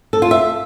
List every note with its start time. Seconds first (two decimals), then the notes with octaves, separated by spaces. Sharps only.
0.13 A4
0.22 F4
0.31 E5